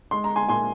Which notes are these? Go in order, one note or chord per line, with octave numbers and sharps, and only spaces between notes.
G#3 C6
A#5
G#5 C6
A#2 G#5 C6